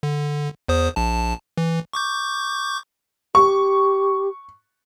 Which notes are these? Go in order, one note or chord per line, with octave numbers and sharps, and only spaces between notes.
D3
E2 C5 D#6
A#1 A5
E3
C#6 D6 G6
G4 C#6